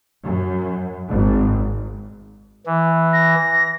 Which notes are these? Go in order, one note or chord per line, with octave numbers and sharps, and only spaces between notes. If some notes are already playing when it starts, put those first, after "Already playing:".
F#2
G#1
E3
A#6